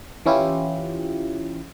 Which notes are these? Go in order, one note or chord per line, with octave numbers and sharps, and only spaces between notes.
E3 C#4 E4 F4 G4